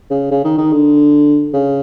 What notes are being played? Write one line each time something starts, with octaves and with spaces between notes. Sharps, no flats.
C#3
C#3
D#3
D#3
D3
C#3